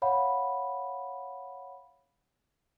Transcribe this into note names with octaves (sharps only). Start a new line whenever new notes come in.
C#5 F5 F#5 B5